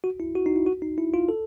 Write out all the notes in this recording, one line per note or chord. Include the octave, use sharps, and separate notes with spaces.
F#4
E4
F#4
D#4
E4
F#4
D#4
E4
F4
A4